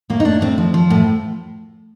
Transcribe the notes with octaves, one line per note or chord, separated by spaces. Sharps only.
A2 A#3
D#4
A2 D4
A2 C4
F3
F3
A2